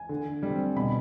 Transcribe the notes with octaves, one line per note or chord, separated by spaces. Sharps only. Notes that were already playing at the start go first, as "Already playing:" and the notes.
Already playing: G#5
D3
G3 C4
B2 B5